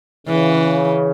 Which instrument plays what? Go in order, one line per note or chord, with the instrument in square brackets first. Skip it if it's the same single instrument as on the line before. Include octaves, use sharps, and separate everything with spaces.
[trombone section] C#3 [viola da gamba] E3